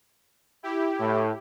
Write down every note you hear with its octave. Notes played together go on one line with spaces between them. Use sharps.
E4 G4
A2